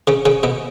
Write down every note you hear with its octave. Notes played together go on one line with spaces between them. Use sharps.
C#3 C#4
C#3 C#4
B2 B3